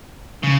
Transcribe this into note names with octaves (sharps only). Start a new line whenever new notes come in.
C#3